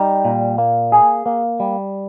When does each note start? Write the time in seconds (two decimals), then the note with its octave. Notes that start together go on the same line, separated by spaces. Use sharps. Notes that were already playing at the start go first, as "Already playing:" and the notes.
Already playing: G3 D#4
0.25 A#2
0.58 A#3
0.92 G#4
1.26 A#3
1.60 G3